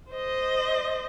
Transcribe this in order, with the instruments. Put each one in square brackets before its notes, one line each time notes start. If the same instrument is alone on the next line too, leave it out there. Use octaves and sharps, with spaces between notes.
[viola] C5 D#5